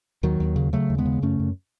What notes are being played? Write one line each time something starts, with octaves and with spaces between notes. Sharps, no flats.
D#2 D#3 F#3
D#2
C#3
C#3 F#3 A3
D#2
G#3 B3
C#3
F#2 A3 C#4
F#2